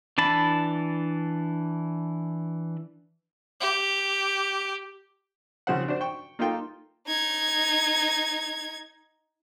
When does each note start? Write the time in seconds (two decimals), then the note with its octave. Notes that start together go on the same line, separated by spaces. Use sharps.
0.18 E3 D4 A5 B5
3.60 G4
5.67 C#3 F3 C4 C5 F#5
5.88 D4 F#4 C5
6.01 G5 C#6
6.39 A#3 D#4 F4 A4 F5 G5
7.07 D#4 G#6